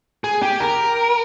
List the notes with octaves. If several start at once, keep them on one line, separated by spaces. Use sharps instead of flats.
G#4
G4
A#4